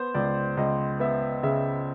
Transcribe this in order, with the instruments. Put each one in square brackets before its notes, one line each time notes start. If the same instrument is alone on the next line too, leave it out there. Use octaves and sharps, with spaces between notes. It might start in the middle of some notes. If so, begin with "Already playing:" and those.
Already playing: [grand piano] B3 C5
C#2 D5
C#2 D#5
B3 E5
C#3 E5